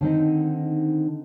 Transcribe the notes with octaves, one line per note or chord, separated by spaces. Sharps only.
D3 D#3 C4 D#4